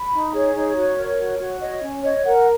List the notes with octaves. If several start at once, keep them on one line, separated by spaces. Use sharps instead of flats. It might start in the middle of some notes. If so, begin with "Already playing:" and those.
Already playing: B5
D#4
G#4 C#5
D#4
F#4
A#4
F#4
F#4
C#5 D#5
C#4
C#5 D#5
A#4 F#5